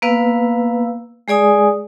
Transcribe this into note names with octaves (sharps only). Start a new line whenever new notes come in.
A#3 B3 B4 F5 E6
G#3 G#4 D5 G#5 D#6